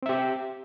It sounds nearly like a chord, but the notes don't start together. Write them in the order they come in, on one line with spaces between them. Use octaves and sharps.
C4 E5 G4